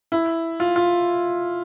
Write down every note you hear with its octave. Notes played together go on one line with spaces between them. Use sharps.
E4
F4
F4